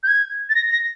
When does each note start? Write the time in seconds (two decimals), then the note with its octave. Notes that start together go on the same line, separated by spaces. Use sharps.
0.03 G6
0.08 G#6
0.49 A6
0.55 A#6
0.72 A#6